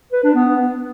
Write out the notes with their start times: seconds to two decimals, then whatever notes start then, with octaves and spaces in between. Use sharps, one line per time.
0.13 B4
0.24 D4
0.35 B3